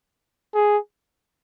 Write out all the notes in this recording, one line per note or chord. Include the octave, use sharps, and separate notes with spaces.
G#4